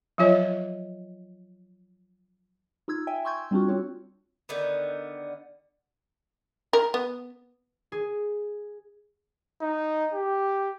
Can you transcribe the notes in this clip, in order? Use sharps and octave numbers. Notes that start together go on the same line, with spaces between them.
F3 F#3 F4 C#5 D#5
D#4 F4 E6 G#6
E5 G5 G#5
C6 C#6 E6 G6 G#6
G3 C4 D4 F4 F#4
C4 F4 F#4 C#5
D3 D#3 B3
A#4
B3
G#4
D#4
G4